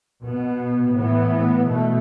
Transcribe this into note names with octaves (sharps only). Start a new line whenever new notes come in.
B2 B3
A2 E3 B3
B2 A3